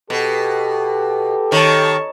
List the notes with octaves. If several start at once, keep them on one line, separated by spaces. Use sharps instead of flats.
B2 G4 A4
D#3 C#5 A5